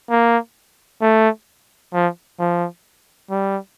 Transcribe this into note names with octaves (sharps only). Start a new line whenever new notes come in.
A#3
A3
F3
F3
G3